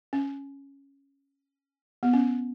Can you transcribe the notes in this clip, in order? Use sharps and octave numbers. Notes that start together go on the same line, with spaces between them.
C#4
B3
C#4